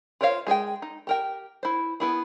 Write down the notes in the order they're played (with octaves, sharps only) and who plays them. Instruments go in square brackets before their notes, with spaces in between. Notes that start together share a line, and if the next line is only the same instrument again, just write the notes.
[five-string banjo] F4 A#4 C5 C#5 F5
G#3 G#4 C5 G5
D#4
G4 A#4 G5
E4 C5
B3 E4 G#4